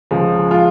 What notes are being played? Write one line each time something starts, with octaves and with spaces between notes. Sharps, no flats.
C#2 C#3 F3 G#3
F3 G#3 F4